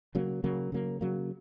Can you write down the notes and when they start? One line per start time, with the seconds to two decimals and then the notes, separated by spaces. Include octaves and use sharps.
0.15 C#3 F#3 A#3
0.44 C#3 F#3 A#3
0.72 C#3 F#3 A#3
1.01 C#3 F#3 A#3